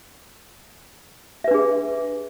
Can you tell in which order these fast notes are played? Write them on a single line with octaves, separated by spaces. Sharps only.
E5 B4 D4 G#4